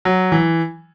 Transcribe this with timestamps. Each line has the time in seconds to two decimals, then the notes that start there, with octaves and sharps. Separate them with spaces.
0.05 F#3
0.32 E3